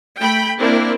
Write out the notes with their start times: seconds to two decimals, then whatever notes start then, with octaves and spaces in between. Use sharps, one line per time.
0.18 A3 G5 B5
0.58 A#3 C4 D4 E4